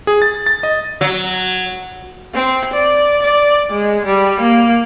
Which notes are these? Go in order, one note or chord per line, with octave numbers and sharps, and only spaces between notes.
G#4
A6
A6
D#5
F#3
C4
D5
D5
G#3
G3
A#3